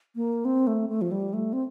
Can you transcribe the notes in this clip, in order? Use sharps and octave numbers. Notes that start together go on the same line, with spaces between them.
A#3
C4
A3
A3
F3
G3
A3
C4